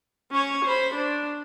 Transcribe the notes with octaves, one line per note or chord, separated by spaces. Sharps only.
C#4 C#5
C5 B5
D4